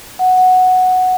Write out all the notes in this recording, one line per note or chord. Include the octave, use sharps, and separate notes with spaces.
F#5
F#5